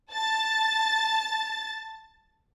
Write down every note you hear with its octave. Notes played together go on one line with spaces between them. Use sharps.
A5 A6